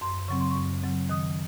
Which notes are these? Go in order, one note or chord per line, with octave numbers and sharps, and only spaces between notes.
F#2 C6
C#3 F#3 C4 C#6
C6
F#2 C#6
C#3 F#3 C4
D#3 D#6